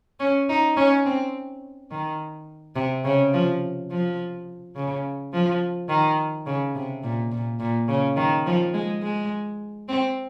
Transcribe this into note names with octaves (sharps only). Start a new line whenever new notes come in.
C#4
D#4
C#4
C4
D#3
C3
C#3
F3
F3
C#3
F3
D#3
C#3
C3
A#2
A#2
A#2
C#3
D#3
F3
G#3
G#3
C4